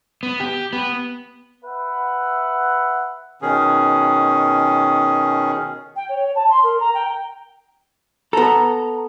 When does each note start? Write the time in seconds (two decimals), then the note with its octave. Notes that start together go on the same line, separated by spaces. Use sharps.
0.23 B3
0.40 G4
0.73 B3
1.65 B4 E5 F#5
3.42 B2 D#3 C#4 G#4
5.96 G5
6.09 C#5
6.35 A5
6.49 C6
6.63 A#4
6.80 A#5
6.94 G5
8.33 B3 A4 A#5